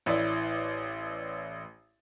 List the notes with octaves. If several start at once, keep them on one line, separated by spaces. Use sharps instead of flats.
A1 E4 D5